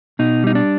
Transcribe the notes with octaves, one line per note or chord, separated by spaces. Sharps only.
B2 D#4
G3 D#4
D4